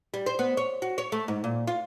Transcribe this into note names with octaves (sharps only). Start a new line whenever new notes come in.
G3
C5
B3
C#5
F#4
C#5
A3
G#2
A#2
F4